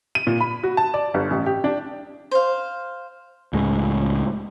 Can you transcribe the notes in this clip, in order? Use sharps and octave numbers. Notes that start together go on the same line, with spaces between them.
D#7
A#2
B5
F#4
A5
D5
G1
A1
G4
D4
C5 F5
C#2 A2 G#3